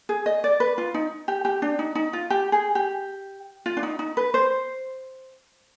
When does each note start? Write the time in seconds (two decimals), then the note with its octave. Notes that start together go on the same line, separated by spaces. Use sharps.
0.09 G#4
0.26 D#5
0.44 D5
0.60 B4
0.78 F4
0.94 D#4
1.28 G4
1.45 G4
1.62 D4
1.79 D#4
1.95 D#4
2.13 F4
2.30 G4
2.52 G#4
2.75 G4
3.66 F4
3.77 D4
3.83 D#4
3.99 D#4
4.17 B4
4.34 C5